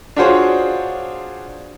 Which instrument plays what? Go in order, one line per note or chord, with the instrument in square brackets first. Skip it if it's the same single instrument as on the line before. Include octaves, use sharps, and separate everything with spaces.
[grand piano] D4 F4 F#4 G#4 C5 C#5